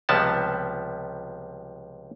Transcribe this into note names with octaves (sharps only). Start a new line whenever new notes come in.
C#2 C3 F3 G3 B3 A5